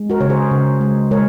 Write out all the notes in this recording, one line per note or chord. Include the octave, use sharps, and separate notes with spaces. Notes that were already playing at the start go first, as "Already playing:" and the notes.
Already playing: G#3
F#4 A#4
C#3 C#5
G#4 C5
C#3
G#3
G#3 A#4 C#5